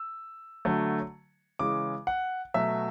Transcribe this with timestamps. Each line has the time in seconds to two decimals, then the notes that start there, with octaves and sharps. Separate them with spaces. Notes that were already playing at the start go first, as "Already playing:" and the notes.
Already playing: E6
0.65 D3 F#3 A3
1.59 C#3 E3 G#3 D6
2.07 F#5
2.54 B2 F#3 A3 E5